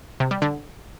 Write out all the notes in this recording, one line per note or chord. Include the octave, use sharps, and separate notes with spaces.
C3
G3
D3